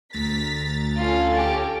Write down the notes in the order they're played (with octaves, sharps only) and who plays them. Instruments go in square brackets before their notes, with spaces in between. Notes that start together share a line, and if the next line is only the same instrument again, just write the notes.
[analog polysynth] D2 A#5 A6 [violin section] B6
[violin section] C#4 A4 [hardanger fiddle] F4
[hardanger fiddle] G4